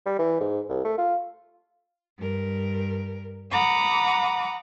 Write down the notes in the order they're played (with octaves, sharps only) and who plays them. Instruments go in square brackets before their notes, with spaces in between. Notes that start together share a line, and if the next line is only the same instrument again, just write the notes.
[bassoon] G3
E3
G#2
C2
A3
F4
[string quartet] G2 A#4
F#5 A#5 B5 D6 D#6